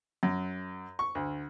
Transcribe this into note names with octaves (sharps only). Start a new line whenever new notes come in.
F#2
C#6
D2